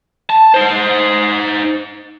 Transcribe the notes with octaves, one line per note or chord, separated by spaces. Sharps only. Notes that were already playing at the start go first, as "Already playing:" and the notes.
A5
D#4 C5